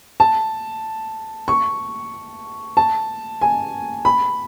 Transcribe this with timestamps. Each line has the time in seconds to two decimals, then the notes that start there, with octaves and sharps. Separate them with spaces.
0.20 A5
1.48 C#6
2.77 A5
3.41 G#5
4.05 B5